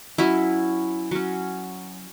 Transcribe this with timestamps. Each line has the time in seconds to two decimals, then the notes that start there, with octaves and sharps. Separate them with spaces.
0.18 F#3 C#4 E4
1.11 F#3 C#4